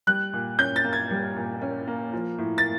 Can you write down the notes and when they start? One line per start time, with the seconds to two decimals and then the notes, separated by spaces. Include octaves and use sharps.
0.07 G3 F#6
0.33 A#2
0.59 C#4 G6
0.76 A6
0.84 A#3
0.93 G#6
1.11 G3
1.36 A#2
1.61 C#4
1.87 A#3
2.13 F3
2.38 A2
2.58 A6